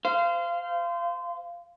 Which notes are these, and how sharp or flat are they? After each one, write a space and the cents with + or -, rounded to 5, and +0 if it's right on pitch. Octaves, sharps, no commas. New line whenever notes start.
C5 -25 F5 -20